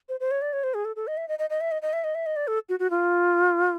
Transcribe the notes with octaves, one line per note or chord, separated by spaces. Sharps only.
C5
C5
C#5
D5
C#5
C5
G#4
A4
A4
D#5
E5
D#5
D#5
D#5
E5
D#5
D#5
E5
D#5
E5
D#5
D5
A4
F#4
F#4
F4